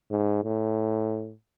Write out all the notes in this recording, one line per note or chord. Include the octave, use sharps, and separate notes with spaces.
G#2
A2